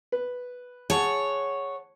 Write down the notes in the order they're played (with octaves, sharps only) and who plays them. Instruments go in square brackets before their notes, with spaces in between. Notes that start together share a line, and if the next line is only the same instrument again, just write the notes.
[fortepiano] B4
[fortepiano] G#4 F#5 A5 [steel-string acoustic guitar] C#5